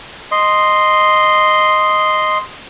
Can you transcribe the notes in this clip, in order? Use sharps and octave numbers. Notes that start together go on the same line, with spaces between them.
D#5 C6